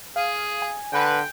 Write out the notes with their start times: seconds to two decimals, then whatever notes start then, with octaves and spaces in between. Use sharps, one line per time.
0.16 G#4 F5
0.62 G#5
0.93 D3 B4 G5